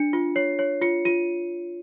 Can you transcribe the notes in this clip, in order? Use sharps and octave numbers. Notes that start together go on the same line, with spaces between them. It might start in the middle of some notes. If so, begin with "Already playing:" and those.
Already playing: D4 C#7
F4
C#5 C7
C#5
F4 C#7
F4 D#7